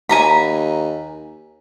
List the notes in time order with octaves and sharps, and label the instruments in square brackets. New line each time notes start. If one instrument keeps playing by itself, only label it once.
[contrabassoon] D#2 [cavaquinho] G#5 A#5 B5